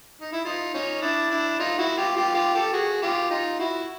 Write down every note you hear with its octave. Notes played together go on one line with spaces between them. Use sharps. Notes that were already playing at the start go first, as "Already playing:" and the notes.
D#4
E4
D#4 F4
C#4 D#4
D4 E4
D4 E4
D#4 F4
E4 F#4
F4 G4
F4 G4
F4 G4
G4 A4
F#4 G#4
F4 G4
D#4 F4
E4 F#4